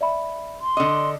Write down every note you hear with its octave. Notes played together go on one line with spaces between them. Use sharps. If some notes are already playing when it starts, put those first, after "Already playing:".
D5 E5 B5
C6
D3 D#5 D6